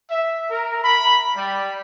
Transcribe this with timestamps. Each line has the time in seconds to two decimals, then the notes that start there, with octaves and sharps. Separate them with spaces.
0.10 E5
0.50 A#4
0.84 B5
1.36 G3